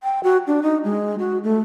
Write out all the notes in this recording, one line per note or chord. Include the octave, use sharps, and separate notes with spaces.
G5
F#4
D4
D#4
G#3
F#4
A3